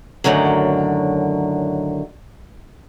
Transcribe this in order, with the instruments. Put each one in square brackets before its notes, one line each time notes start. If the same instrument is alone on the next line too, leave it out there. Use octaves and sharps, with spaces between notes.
[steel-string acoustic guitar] F#2 A2 D3 D#3 F#3